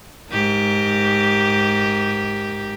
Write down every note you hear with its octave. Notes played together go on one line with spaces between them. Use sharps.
G#2 G4 A#4